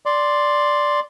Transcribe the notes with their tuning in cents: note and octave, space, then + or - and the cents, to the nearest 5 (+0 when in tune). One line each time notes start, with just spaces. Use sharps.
D5 +0 C6 +0